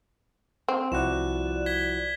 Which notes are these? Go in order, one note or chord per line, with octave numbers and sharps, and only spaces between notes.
C4
C2 F3 E4 F#4 D5 F#6 E7
G#6 B6 G7